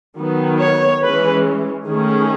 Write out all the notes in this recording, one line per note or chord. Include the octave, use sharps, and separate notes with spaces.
D#3 F#3 B3
C#5
E3 G#3 C#4 B4
D#3 A3 C#4 G#4